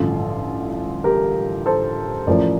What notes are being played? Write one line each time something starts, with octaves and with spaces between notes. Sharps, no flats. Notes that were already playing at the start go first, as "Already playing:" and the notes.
Already playing: A1 G2 D3 F3 F4 A4
G4 A#4
A4 C5
A1 A2 F3 A#4 D5